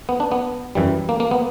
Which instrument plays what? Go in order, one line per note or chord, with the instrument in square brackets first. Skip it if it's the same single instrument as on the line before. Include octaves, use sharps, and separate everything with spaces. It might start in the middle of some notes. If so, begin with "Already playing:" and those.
[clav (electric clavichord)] B3
D4
B3
F#2 E3 G3
A#3
A#3
B3